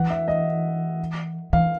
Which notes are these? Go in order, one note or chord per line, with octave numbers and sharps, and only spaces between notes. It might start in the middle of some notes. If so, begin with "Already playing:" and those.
Already playing: E3 F#5
E5
D#5
E3 F5